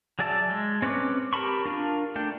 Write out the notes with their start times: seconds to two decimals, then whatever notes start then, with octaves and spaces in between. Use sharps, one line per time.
0.19 F#3 G#4 D5 E5 A5
0.50 G#3
0.82 C4 C#4 B4 C#5 D6
1.33 G4 A#4 A5 B5 C#6
1.65 D4 F4 A#4
2.15 A3 D4 G5